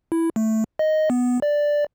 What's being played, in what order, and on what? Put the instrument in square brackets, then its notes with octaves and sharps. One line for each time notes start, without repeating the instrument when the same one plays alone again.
[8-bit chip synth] E4
A3
D#5
B3
D5